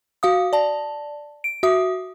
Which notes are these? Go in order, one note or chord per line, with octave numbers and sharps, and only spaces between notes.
F#4 F5 D#6
D5 A5
D7
F#4 E5 D#6